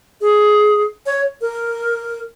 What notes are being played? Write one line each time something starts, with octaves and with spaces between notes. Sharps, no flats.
G#4
C#5
A#4